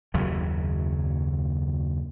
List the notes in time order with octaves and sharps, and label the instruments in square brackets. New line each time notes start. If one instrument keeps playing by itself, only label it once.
[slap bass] F#1 D#2 C#3 F#3